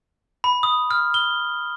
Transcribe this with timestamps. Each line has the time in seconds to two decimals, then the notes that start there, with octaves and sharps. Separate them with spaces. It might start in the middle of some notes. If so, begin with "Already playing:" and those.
0.44 B5
0.63 D#6
0.91 F6
1.14 G7